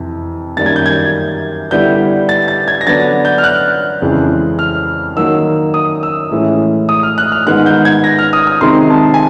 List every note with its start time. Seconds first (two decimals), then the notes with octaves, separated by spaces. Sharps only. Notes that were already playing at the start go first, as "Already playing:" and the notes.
Already playing: F2 C3 E3
0.57 F#2 D#3 G3 A#3 A6
0.66 G#6
0.76 G6
0.86 G#6
1.71 D3 G3 B3 E4 G6
2.29 A6
2.48 A6
2.68 G#6
2.81 A#6
2.87 D3 F#3 B3 D4 A6
3.25 G6
3.38 F6
3.44 F#6
4.02 F2 C#3 E3 G#3
4.59 F6
5.17 D#3 F#3 A#3 D#4 E6
5.74 D#6
6.03 E6
6.31 A2 E3 G#3 C#4 E4
6.89 D#6
7.03 F6
7.18 F#6
7.32 F6
7.47 G#2 D#3 G#3 B3 D#4 F#6
7.66 G6
7.85 G#6
8.04 A#6
8.19 F6
8.33 D#6
8.47 D#6
8.61 C3 D#3 G#3 C4 D#4 C6
8.90 A5
9.14 G#5